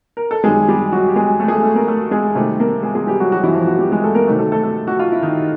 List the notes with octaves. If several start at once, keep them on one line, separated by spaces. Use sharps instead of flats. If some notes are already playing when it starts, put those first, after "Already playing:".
A#4
A4
F#2 D#3 G3 G#3 G#4
G3 G4
F#3 F#4
G4
G#3 G#4
A3 A4
G#4
A3 A4
A3 A4
A#3 A#4
A3 A4
G#3 G#4
C3 D#3 G3 A3 A4
A#3 A#4
G#3 G#4
G#3 G#4
G3 G4
F#3 F#4
F#3 F#4
E3 E4
F3 F4
F#3 F#4
G3 G4
G#3 G#4
A3 A4
A#3 A#4
C3 D#3 F#3 A3
A3 A4
A3 A4
A3 A4
F#4
F4
E4
D#3 D#4